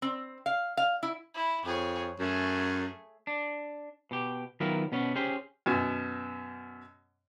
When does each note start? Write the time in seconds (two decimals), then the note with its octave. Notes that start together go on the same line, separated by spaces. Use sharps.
0.02 C4
0.46 F5
0.77 F5
1.03 E4
1.34 E4
1.65 F2 G#4 C#5
2.19 F#2 A3 G#4
3.27 D4
4.11 B2 G4
4.60 D#3 F#3 B3 E4 F4 A#4
4.92 B2 B3 C#4
5.15 C#4 G4 G#4 C5
5.66 F#2 B2